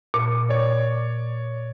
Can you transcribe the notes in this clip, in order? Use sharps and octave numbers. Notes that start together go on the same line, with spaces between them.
A#2
C#5 D5